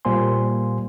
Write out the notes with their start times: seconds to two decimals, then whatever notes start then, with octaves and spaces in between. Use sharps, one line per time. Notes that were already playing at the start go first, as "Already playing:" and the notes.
0.05 A#2 G3 A#3 C5 G#5 C6